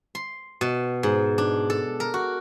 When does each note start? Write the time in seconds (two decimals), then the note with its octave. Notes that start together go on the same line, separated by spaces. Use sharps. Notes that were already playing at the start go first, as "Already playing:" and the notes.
0.15 C6
0.61 B2
1.03 G#2
1.38 D4
1.70 A4
2.00 A#4
2.14 F#4